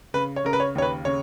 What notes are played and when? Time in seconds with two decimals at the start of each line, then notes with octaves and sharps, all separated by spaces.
0.14 C#3 B4
0.36 C#5
0.44 C#3 A#4
0.53 B4
0.60 C#5
0.75 D#2 C#5
0.82 B4
1.05 C#3 C#5